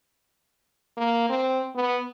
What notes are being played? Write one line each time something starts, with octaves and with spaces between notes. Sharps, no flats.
A#3
C4
B3